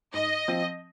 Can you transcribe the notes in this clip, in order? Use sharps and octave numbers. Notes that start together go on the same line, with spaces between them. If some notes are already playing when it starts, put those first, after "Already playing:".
G#2 D#5
F3 C4